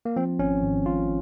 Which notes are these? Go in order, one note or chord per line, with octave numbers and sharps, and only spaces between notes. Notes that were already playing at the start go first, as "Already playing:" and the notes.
A#3
F3 C4
G#1 C#4
G#1
G#2 F4